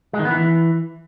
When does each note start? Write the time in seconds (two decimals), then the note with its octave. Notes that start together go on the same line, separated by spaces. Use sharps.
0.13 G#3
0.19 D#3
0.25 B3
0.31 E3